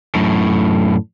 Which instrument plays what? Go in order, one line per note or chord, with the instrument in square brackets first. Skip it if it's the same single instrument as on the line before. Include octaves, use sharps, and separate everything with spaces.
[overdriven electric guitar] F#2 A2